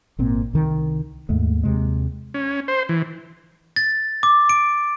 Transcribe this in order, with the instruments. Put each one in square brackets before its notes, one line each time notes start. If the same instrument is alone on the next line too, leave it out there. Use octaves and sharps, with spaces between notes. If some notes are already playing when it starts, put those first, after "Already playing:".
[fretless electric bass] G#1 A#2 C4
C2 D#3
D#2 G#2 G#3 A3
D#2 C3 G#3
[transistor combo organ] C#4
C5
E3
[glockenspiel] A6
D6
D7